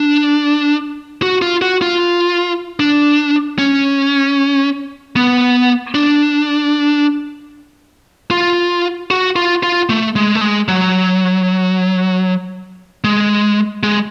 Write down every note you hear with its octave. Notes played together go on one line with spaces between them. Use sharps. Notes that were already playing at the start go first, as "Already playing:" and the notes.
Already playing: D4
F#4
F4
F#4
F4
D4
C#4
B3
D4
F4
F#4
F4
F4
A3
G#3
A3
G#3
F#3
G#3
G#3